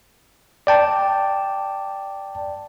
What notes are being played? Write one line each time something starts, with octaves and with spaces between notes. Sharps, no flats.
D5 G5 A5